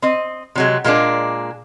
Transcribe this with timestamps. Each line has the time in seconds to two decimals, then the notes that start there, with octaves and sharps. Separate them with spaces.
0.02 C4 D#5
0.55 C3 F#3 G#3
0.84 A#2 G#3 A#3 D4